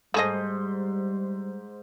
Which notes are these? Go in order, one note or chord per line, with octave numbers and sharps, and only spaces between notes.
G#2 G3 A3 G#4 C5 D#5